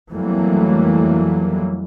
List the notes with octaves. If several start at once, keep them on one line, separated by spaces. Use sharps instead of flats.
F2 E3 F#3 G3 A3 A#3